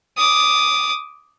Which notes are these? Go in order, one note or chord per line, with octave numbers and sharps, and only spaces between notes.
D6 D#6